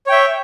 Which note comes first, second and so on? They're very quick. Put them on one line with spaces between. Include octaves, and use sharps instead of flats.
C#5 G5 E5